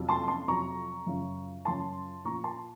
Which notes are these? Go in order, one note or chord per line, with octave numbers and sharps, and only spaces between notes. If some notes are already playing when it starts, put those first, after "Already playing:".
Already playing: F2 C3 F#3
A5 C6
A5 C6
F2 C3 F#3 A#5 C#6
F#2 C#3 F3
F#2 C#3 F3 A5 C6
A#2 F3 A#5 C#6
A5 C6